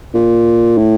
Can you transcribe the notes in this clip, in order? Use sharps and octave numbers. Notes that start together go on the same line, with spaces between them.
A#2
A2